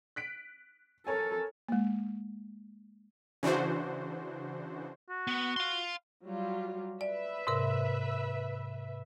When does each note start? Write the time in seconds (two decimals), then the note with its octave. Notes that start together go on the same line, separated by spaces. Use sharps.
0.16 F#6 B6 D7
1.07 A4 A#4 C#5 G#5
1.69 G#3 A#3
3.43 C#3 E3 D4 F#4 C5
5.10 F#4
5.27 B3
5.57 F5 C6
6.25 F#3 G3 F4
7.01 B4 D5 E5
7.47 G#2 C3 A#4